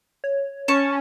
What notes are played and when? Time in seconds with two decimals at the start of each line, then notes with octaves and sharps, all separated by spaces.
0.24 C#5
0.68 C#4 A5 C#6